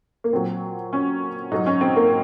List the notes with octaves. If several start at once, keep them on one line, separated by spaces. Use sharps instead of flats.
A#3
A#2 F#3 C4
C#4
G#2 F#3 D#4
C#4
C4
A#3